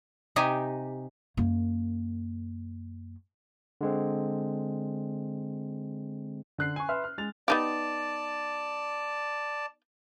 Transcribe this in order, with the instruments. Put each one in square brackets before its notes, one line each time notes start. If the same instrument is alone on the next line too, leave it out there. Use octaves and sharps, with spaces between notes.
[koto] C3 D#4 G4 D#5 G#5
[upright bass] F#2 A#3
[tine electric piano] D3 G#3 C4
[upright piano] D3 F#6 C7
G#5 C#6
B4 E5 C6 F6
F6
G#3 A6 F7
[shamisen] B3 D#4 G4 [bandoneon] D5 A5